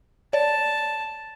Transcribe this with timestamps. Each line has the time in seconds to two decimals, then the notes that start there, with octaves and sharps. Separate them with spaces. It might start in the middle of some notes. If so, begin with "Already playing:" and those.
0.33 C#5 D5 A5